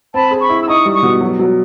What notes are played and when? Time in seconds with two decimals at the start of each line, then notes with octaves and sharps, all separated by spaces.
0.13 C4 A5 B5
0.31 G#4
0.40 B5 C#6
0.49 E4
0.61 E6
0.68 D#4 C#6 D#6
0.85 G3
0.95 C#6 D#6
1.03 B2
1.21 F#3
1.39 F#3